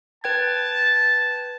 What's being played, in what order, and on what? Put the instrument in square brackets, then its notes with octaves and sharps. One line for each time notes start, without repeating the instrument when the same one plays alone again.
[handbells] B4 G5 G#6 [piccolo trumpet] A5